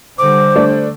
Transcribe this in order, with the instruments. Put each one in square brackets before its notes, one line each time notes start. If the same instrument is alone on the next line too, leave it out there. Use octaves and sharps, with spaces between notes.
[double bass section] D3 G3 [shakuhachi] C5 [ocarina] D6
[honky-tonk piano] A3 D4